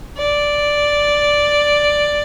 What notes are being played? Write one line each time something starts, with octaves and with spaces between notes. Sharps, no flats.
D5